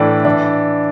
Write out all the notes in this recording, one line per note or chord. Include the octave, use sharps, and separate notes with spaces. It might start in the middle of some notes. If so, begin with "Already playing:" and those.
Already playing: A2 E3 D4
E3 D4